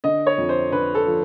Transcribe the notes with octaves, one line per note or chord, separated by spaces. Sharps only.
D3 D#5
C#5
F2
C5
D3 B4
A4
F3